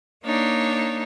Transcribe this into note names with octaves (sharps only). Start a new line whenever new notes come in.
A#3 D4 D#4 C#5